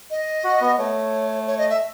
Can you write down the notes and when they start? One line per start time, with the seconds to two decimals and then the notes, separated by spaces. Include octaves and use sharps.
0.11 D#5
0.44 F#4
0.61 B3
0.78 A3 C#5
1.47 C#5
1.58 D#5
1.69 E5